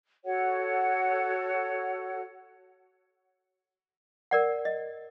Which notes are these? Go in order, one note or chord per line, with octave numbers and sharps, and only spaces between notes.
F#4 A4 C#5 F#5
A#4 D5 F#5
D#5